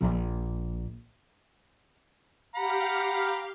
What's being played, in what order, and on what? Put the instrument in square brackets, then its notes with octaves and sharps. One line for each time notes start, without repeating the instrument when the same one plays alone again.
[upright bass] A#1
[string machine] G4 F5 [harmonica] F#5 A#5 B5